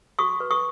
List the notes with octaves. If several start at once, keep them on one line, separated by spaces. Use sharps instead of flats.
F#4 C#6 D#6
B4
C#6 D#6